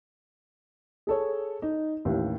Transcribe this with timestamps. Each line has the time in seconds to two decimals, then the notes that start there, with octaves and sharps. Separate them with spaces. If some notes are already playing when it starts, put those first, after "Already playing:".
1.07 G#4 A4 C#5
1.62 D#4
2.05 A1 D#2 A2